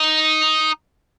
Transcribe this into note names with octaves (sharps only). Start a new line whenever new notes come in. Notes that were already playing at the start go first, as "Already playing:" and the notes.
Already playing: D#4